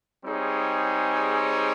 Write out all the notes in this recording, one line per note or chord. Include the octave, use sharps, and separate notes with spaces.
G3 C4 D#4 G#4 C#5